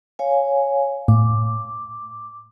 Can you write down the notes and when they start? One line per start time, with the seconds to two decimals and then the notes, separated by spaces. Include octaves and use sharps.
0.19 C#5 F5 G#5
1.08 A2 D6